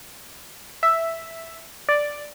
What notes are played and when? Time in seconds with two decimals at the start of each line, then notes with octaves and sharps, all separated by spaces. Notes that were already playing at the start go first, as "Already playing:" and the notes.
0.83 E5
1.89 D5